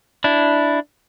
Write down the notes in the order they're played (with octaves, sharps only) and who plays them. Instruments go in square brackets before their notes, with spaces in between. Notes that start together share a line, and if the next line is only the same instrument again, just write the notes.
[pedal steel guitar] D4 E4